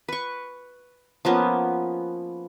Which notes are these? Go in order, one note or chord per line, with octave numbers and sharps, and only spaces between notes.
B4 C#6
F3 A#3 B3 C#4